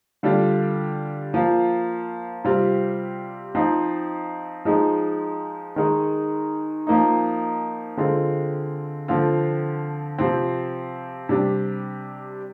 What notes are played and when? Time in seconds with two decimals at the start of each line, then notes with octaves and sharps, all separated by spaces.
0.23 D3 G3 D4 F4
1.34 F3 A#3 F4
2.44 C3 G3 C4 F4
3.55 F3 C4 D#4
4.65 F3 G#3 D#4
5.76 D#3 G#3 D#4
6.87 F3 A#3 D#4
7.97 D3 G#3 C4 F4
9.08 D3 F3 C4 F4
10.18 C3 F3 C4
11.29 C3 G3 D4